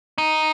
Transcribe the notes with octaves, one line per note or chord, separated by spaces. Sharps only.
D#4